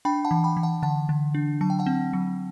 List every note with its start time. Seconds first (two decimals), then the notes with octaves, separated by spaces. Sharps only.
0.05 D4 G5 B5
0.25 F#5 A5
0.31 E3
0.44 G5 B5
0.57 E3
0.63 F#5 A5
0.83 D3 F#5 A5
1.09 D3
1.35 D4
1.61 F#3 A5
1.70 G5
1.79 F#5 A5
1.86 C4
2.13 F#3